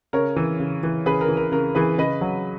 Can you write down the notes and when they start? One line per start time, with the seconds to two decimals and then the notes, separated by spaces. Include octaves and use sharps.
0.13 C#3 A#4 C#5
0.36 E3
0.60 C#3
0.83 E3
1.06 C#3 G#4 B4
1.21 A#4
1.29 E3
1.37 A#4
1.52 C#3 A#4
1.75 E3 G#4 B4
1.98 C#3 B4 D#5
2.21 F#3